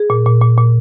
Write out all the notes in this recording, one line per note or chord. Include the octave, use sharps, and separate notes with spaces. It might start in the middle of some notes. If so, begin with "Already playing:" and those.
Already playing: G#4
A#2
A#2
A#2
A#2